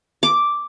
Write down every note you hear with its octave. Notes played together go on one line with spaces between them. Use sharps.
D6